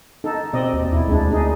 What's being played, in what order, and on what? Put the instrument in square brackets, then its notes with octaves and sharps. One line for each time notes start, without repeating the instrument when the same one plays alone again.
[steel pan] D#4 A4
[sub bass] B2 [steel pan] C4 D5 D#5
[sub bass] D#2
[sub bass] E2 [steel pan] E4
[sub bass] D2 [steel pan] G#3 D4
[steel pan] D4 D#4 G#4